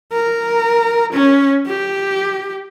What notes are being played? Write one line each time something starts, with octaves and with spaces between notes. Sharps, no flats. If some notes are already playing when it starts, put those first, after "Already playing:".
A#4
C#4
G4